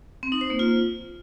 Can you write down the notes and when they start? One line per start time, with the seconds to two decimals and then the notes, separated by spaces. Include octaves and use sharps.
0.23 C4
0.32 D#4
0.41 C5
0.50 A#3
0.59 F4